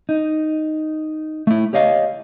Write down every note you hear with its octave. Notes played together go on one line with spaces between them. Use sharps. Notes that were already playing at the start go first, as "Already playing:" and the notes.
D#4
A3 E4
G4 C#5 D#5 F5